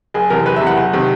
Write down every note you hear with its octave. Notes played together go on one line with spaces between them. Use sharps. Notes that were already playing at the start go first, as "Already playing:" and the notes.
F#1 G#4
E2 C3 A#4
F#1 B4
E5
E2 C3
F#5
F#1
C3 D#3